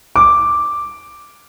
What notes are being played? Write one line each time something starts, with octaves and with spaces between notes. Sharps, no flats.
D6